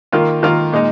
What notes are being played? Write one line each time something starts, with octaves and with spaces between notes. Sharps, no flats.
D#3 A#3 F4 A#4
D#3 A#3 F4 A#4
A#2 G#3 D#4